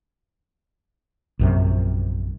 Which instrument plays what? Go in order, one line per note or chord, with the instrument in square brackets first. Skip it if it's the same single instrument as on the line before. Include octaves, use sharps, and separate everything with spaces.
[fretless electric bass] A#1 F#2 C3